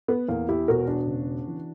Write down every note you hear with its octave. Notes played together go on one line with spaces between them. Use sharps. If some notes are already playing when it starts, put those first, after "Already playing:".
B3
E2 A#3
E4 G4
E1 F#4 A#4
D4 F#4
C#3
E3